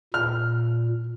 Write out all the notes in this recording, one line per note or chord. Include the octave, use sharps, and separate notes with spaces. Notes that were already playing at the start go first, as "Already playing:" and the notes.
A#2 F6